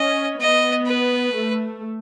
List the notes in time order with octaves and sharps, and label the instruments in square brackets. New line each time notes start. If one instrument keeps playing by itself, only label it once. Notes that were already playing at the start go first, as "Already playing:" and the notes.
Already playing: [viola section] C#4 [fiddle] D#5
[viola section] B3 [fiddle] D#5
[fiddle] B4
[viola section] A3